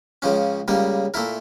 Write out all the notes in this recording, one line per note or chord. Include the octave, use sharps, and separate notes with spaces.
C#2 C#3 F3 C#4
C#2 C#3 G3 A#3
A#2 A3 E4 A#4